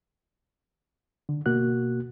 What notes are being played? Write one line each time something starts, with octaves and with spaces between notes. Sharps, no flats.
D3
B2 A#3 F#4 F#6